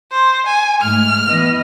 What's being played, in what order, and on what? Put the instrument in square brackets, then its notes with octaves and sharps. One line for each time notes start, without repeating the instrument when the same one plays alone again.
[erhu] C5
G#5
[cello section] G#2 A3 [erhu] F6
[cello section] E3 B3 D#5